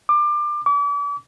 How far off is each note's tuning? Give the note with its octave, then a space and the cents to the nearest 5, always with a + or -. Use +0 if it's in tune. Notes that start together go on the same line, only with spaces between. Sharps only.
D6 +25
D6 -40